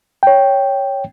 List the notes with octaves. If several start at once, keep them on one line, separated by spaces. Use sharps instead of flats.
C#5 G5